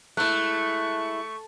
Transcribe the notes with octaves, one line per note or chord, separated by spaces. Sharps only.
G#3 A3 E4 C#6 F#6